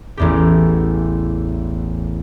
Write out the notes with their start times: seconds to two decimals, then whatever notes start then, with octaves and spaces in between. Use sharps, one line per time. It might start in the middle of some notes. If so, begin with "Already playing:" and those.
0.17 A1 E2 G4